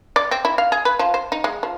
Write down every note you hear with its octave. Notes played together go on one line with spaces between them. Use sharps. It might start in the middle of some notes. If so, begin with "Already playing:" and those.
D5
C4
E4
F5
G#4
B4
F3
C5
D#4
G#3
F3